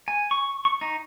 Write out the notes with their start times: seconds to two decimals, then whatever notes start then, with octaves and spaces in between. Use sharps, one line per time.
0.08 G#5
0.31 C#6
0.65 C#6
0.81 D#4